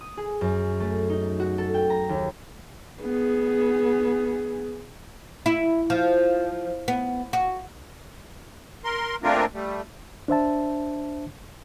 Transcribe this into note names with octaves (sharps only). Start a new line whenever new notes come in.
D#6
G#4
F#2
A3
D#4
F#4
A4
G5
A#5
D#2
B3 G#4
E4
F3
B3
F#4
A#4 C6
A3 A#3 C4 D4 F4 A#4
G3 A3
D4 C5 E5 A5